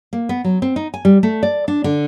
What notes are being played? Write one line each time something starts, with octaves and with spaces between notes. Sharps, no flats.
A#3
B3
F#3
C4
D#4
G#5
G3
A3
D5
D4
D3